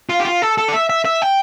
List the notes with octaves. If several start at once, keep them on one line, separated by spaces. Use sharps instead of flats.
F4
G4
F4
A4
A4
D5
E5
E5
E5
G5